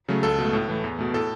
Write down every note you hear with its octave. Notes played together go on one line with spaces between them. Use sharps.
C#3 F#3 A3
C#2 A4
B2 A3
A2
E3 A3
E2
B2 A3
A2 A4